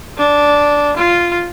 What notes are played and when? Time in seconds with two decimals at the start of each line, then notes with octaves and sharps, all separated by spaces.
0.18 D4
0.97 F4